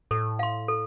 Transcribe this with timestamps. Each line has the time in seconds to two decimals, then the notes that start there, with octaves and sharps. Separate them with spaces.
0.11 A2 A4
0.39 F5 C6
0.68 A4